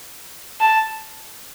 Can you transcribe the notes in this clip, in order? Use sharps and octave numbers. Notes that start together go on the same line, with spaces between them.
A5